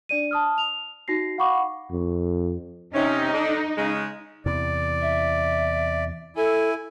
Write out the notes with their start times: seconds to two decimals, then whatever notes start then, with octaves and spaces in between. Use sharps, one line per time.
0.09 D4 D5 D#7
0.31 A5 D#6 F6
0.58 F7
1.08 D#4 F#4 A#6 C7
1.38 F5 F#5 B5 C#6 D6
1.91 F2
2.94 C3 C#4 D#4
3.32 D3 D4
3.77 C#3 G#3
4.46 E2 C3 E3 D5
5.01 E5
6.36 E4 A4 G#5